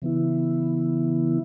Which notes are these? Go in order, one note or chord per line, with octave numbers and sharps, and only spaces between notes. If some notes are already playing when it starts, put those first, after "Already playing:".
C#3 E3 B3 E4